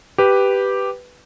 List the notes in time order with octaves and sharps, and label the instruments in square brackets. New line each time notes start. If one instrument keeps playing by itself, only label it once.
[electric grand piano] G4 B4